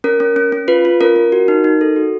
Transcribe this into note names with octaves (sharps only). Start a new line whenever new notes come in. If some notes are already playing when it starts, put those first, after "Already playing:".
C#4 A#4
C#4
C#4
C#4
F4 B4
F4
C#4 A#4
C#4
F#4
D#4
D#4
A4
F#4